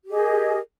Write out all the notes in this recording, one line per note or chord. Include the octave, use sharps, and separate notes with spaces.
G4 G#4 A#4 D#5